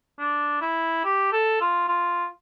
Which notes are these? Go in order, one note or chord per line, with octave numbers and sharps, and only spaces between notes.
D4
E4
G4
A4
F4
F4